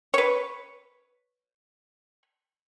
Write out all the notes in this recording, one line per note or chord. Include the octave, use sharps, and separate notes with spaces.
B4 C#5